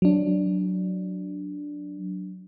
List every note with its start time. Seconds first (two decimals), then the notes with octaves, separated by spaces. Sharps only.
0.02 F#3 D4